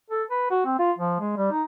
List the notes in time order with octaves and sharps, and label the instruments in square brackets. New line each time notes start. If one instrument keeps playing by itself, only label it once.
[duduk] A4
B4
F#4
C4
F4
F3
G#3
G3
D#4